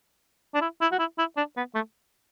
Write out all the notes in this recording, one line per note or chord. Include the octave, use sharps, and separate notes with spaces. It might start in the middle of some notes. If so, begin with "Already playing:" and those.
D4
E4
E4
F#4
E4
E4
D4
B3
A3